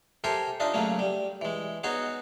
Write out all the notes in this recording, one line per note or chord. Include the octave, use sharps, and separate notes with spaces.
G4 A4 A#4 C5 E5 G#5
D4 D#4 F4 D#5 E5
C#3 F#3 A3 A#3 C#4
G3
E3 G#3
B3 D#4 F#4 G#4 C#5